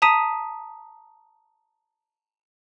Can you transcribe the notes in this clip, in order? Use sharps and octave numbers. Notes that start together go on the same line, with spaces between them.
A5 A#5 D#6 B6 D#7